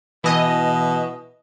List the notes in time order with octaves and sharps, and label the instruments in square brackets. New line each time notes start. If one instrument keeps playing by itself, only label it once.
[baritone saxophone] B2 [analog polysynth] E3 D#5